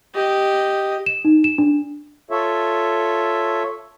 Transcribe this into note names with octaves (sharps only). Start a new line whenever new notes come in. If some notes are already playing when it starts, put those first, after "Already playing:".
G4 D#5
E7
D#4
E7
D4
F4 A4 C#5 E5